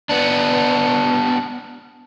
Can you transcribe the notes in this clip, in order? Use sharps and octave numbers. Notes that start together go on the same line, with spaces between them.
B3 D4